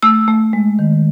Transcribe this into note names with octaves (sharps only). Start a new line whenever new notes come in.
A3 E6
A3
G#3
D#3